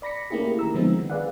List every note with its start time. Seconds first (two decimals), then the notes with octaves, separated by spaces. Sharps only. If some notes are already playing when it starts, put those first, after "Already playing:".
0.02 D5 B5 A#6 B6 C#7
0.30 A3 A#3 C#4 E4 G4 G#4
0.59 D#3 A#5 E6
0.75 D3 F3 G#3 B3 C4 D#4
0.92 D#3
1.10 G#4 B4 D5 F5 F#5